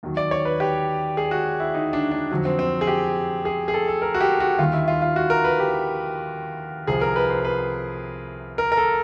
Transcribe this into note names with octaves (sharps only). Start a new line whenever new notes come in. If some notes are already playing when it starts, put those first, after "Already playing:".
D#2 D#3 F#3
D5
C#5
B4
G4
G#4
F#4
E4
D#4
D4
D4
F2 D3 F#3
C4
C4
G#4
G4
G#4
G#4
A4
A4
A#4
F#4
G4
F#4
D#2 D#3 G3 F4
E4
F4
F4
F#4
A#4
B4
G4
C2 C3 F3 G#4
A#4
B4
C5
B4
A#4
A#4
A4